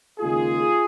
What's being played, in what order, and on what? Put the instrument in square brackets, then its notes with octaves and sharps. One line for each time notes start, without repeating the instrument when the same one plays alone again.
[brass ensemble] D#2 C#3 G#3 F4 G#4